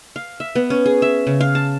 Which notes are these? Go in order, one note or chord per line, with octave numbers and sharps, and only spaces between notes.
F5
E5
B3
C#4
G#4
E5
C#3
F5
A5